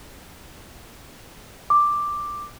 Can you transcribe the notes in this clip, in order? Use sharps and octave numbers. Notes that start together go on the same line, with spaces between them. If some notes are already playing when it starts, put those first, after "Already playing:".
D6